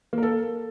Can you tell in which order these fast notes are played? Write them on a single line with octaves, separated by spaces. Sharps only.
A#3 A#4 A4